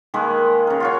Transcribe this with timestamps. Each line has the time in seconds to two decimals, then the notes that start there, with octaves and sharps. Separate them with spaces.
0.14 D#3 G#3 A#3 B4
0.67 C#3 A#4
0.80 F4 F#4 C#5